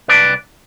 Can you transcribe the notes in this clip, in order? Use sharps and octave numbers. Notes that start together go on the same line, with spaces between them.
C2 B4 D5